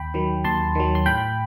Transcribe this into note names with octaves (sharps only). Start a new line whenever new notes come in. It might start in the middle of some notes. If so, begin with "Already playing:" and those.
Already playing: D#2 G5 B5
D#3 F#3
D#2 A5 C6
D#3 F#3
C6
A2 G5 B5